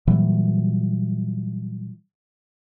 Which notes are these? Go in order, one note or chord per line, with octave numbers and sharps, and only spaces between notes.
A#2 E3 F#3 G3